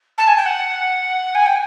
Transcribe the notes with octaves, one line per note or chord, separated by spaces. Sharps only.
A5
G#5
G5
F#5
G#5
G5